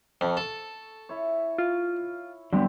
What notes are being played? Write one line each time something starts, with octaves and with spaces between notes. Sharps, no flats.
F2 A5 C#6
A4
E4 C#5
F4
D3 F#3 G3 B3 C4